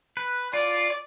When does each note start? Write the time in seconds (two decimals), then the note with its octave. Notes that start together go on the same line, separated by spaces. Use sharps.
0.17 B4
0.53 F4 D5